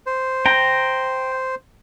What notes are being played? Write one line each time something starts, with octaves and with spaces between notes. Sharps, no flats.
C5
G5 A#5